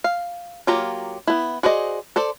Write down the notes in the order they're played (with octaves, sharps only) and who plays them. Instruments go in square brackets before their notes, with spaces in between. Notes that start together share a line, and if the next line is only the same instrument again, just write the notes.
[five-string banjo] F5
F#3 A#3 F4 G4 A#5
B3 E4
F#4 G#4 C5 D5 D#5
A4 C5 D5